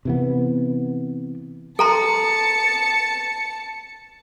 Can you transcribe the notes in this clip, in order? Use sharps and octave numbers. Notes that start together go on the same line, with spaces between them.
C3 E3 B3
A4 A5 A#5 C6 C#7